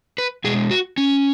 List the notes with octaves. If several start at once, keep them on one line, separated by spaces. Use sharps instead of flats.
B4
B2 G#3 G#4
F#4
C#4